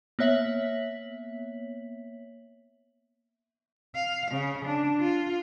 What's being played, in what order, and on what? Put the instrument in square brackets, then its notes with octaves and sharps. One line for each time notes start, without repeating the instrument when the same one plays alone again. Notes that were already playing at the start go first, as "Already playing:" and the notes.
[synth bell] A#3 B3 C#5 E5 B6 F#7
[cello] F5
C#3
D4
F4